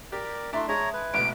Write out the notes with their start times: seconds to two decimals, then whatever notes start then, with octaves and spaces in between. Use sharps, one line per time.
0.12 G4 A#4 D5
0.53 A3 D4 E4 D5 A5 A#5 C6
0.69 G#3 C#5 E5 A#5 D#6
0.94 B4 G#6
1.14 A1 B2 G#3 A3 B3 D7